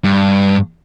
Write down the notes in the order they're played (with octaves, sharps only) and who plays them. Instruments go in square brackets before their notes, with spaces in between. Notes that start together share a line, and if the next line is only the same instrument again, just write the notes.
[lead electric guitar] G2